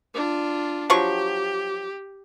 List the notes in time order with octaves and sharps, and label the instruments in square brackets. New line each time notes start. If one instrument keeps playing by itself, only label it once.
[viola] D4 F4
[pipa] F3 F#3 C#6 [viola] G4